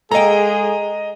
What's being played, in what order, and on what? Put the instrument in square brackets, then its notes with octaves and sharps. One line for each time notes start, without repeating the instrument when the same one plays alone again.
[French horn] G#3 [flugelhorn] G#4 [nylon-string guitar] A4 F5 G5 [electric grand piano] D#5 A#5